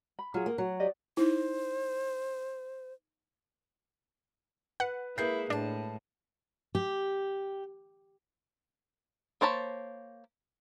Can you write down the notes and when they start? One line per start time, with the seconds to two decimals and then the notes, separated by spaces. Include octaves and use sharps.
0.19 B5
0.34 F#3 F4 G#4
0.46 A#3
0.58 F#3 F#4
0.80 G4 D5 D#5
1.17 D#4 E4 C5
4.80 B4 F#5
5.18 G#3 A#3 E4 G#4 B4 G6 C7
5.50 A2 G#3 D4 A5
6.75 G4
9.41 A#3 C5 C#5 A5 B5